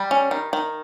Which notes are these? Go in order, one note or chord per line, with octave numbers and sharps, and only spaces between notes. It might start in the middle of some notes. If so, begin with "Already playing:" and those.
Already playing: G3
C#4
D#3
D#3